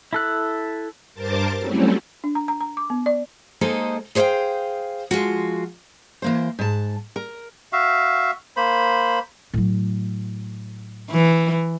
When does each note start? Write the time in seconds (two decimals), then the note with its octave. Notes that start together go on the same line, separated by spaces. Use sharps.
0.13 E4 A4 F#6
1.14 G2 A#4 C5 A5 D6 A6
1.58 F#3 G3 A3 C4 C#4 E4
2.24 D4
2.35 A#5
2.48 A#5
2.61 A#5
2.77 D6
2.90 B3
3.06 D5
3.61 G#3 A#3 D#4 A4 C5 D#5
4.15 G#4 C5 C#5 E5 F5 G5
5.11 F3 G#3 F4 F#4
6.22 E3 A#3 C5
6.59 G#2 A5
7.16 A#4
7.73 F#4 E5 F5
8.56 A#3 C5 B5
9.54 A2 F#3
11.11 E3